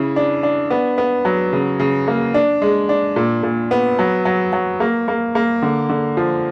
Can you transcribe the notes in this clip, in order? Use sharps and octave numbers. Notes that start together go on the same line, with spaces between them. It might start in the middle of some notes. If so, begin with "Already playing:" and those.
Already playing: C#3 E4
D4
D4
B3
B3
F#3
C#3
C#3
A#3
D4
G#3
D4
A#2
A#2
B3
F#3
F#3
F#3
A#3
A#3
A#3
D3
D3
F3